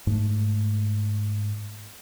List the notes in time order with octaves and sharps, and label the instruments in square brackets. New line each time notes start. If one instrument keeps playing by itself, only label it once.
[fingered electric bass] G#2 A3